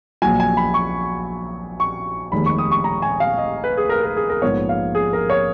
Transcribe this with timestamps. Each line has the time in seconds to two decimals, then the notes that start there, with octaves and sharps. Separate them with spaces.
0.22 A#1 A#2 F#3 G#5
0.40 G#5
0.57 B5
0.74 C#6
1.80 C#6
2.32 F1 D#2 D#3 G#3 B5
2.46 C#6
2.58 D#6
2.71 C#6
2.84 A#5
3.02 G#5
3.20 F5
3.38 D#5
3.64 B4
3.77 G#4
3.89 A#4
4.03 A#4
4.17 G#4
4.29 A#4
4.42 A#1 G#2 F3 B3 C#5
4.69 F5
4.95 G#4
5.13 A#4
5.30 C#5